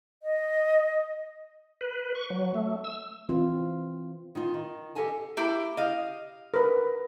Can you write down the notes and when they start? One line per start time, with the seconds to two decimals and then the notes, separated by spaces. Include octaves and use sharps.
0.23 D#5
1.81 B4
2.15 C#6
2.30 F#3
2.54 A3
2.84 E6
3.29 E3 C4 F4
4.35 D#3 D#4 F4
4.54 D#3
4.95 G4 A4 D#5 F5 G#5 A5
5.37 A#3 E4 G4
5.77 D#5 F5
6.54 A#4 B4